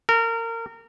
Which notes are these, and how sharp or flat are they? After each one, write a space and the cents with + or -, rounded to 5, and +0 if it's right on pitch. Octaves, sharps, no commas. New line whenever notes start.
A#4 -25